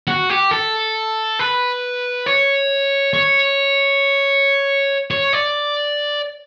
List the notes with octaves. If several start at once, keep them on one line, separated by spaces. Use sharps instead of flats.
F#4
G4
A4
B4
C#5
C#5
C#5
D5